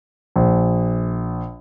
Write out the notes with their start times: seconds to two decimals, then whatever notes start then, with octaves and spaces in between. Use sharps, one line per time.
0.36 A#1